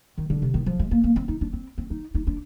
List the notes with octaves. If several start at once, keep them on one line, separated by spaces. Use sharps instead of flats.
D#3
D3
C3
D#3
F3
G#3
A#3
A#3
C4
D#4
D4
C4
C4
D#4
D#4
D4